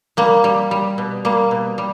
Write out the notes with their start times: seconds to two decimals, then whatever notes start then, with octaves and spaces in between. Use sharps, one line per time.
0.17 G3 A#3
0.44 G3
0.71 G3
0.98 B2
1.25 G3 A#3
1.51 B2
1.78 G3